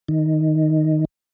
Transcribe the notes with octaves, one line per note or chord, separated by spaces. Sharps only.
D#3